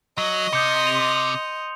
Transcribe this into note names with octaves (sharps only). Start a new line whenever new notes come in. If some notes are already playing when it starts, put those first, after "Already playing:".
F#3 D#5
C3 D#6 G6 C#7
C6 F7